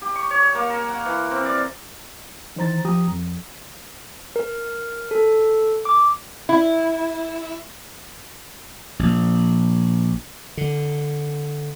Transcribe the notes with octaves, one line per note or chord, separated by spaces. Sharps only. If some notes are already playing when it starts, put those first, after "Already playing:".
G4
C#6
C#5
A#3
A#4
F#5
E3
C4
D5
D#3 E3 C5 A#5 A6
F3 G4 A#5 D#6
F2
A#4
A4
D6
E4
A#1
D3